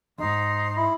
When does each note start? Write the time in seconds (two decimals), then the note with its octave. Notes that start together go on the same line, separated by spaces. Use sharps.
0.18 D#2 G#2 D#4 C6
0.77 E4